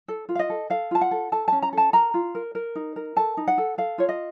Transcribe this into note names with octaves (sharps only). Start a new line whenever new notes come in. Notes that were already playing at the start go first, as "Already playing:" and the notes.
A4
F4
F5
D#5
A4
A4 F5
F4 A5
F#5
A4
A4 A5
C#4 A5
A#5
A4 A5
A#4 A#5
F4
A#4
A#4
D#4
A#4
A4 A5
D#4
F#5
A4
A4 F5
F4 C#5
D#5